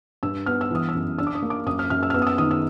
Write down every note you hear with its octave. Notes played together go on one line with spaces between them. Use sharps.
G2 E6
B3 F6
E6
E3 D#6
E6
F#2
D4 E6
D6
D#6
A#3
D6
F#2 D#6
F6
F#2 F6
E6
F6
B3 E6
D#6
E6
D#3 D#6
E6